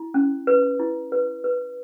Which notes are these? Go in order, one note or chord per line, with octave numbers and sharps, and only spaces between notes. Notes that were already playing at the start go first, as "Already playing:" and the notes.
Already playing: E4
C#4
B4
E4
B4
B4